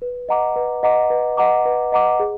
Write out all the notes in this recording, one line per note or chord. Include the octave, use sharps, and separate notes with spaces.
B4
D#5 F#5 A#5 D6
B4
D#5 F#5 A#5 D6
B4
D#5 F#5 A#5 D6
B4
D#5 F#5 A#5 D6
G#4